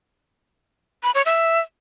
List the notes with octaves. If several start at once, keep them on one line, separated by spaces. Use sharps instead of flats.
B5
C#5
E5